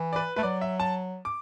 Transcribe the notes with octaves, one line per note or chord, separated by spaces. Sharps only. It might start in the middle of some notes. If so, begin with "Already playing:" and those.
Already playing: E3
D5
B4
A3 B4
F#3 D5
E5
A5
D6